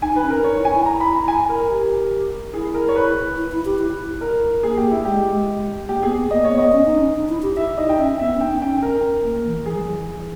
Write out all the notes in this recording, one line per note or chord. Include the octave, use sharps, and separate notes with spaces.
D#4 G#5
D#4 B4
C#4
A#4
D#4 C#5
E4
G#5
E4
A#5
B5
A#5
G#5
A#4
G4
E4 G#4
A#4
C#5
B4
E4
E4
G4
E4
A#4
A#3 G#4
G4
E4
G#3 G4
G#3
A#3 G4
B3 G#4
B3
A#3 D#5
C#5
B3
D#5
C#4
D#4
C#4
D#4
E4
G4
E4 E5
D#4 D#5
G5
C#4 E5
B3 E5
C#4
D#4 G5
D#4
C#4 G5
A#4
A#3
E3
E3 G#4
G3
E3